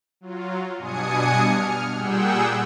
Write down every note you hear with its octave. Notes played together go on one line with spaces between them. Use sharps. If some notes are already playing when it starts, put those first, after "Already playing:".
F#3 F4
G2 B2 D4 G#5 D#6 C#7
F6
A#2 G3 G#4 F#5 G5 E6